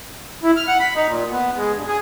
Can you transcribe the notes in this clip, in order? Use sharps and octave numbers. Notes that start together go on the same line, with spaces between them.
E4
F6
F#5
B5
D#4
A#2
B3
G#3
G2
G#4